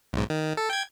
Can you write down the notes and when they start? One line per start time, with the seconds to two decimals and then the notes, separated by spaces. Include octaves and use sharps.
0.13 B1 G#2
0.30 D#3
0.57 A4
0.70 G5 G#6